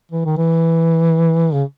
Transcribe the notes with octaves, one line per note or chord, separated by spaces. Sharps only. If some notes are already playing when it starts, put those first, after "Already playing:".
E3
D#3
E3
C#3